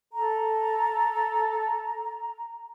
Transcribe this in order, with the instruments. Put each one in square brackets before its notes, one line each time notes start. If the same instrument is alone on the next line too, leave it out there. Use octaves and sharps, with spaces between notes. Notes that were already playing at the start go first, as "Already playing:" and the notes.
[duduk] A4 [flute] A#5